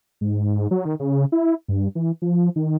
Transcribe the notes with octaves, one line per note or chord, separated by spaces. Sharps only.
G#2
F#3
D#3
C#3
E4
G2
E3
F3
D#3